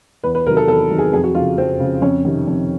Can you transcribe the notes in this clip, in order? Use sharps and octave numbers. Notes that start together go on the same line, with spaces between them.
E2 B4
B4
C3 D#3 F#3 A#4
A4
E2 A4
C3 D#3 F#3
G#4
F2 G#4
F#4
C#3 F3 F4
F2 C4
C#3 F3
F2 C#4
C3 D#3
F2